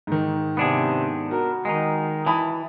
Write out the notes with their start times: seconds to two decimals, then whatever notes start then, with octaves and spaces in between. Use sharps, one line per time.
0.07 G#2 D#3
0.57 C3 B3 D4 G#4
1.31 F#4 A#4
1.65 D#3 G#3 D#4
2.26 E3 A5 B5 D#6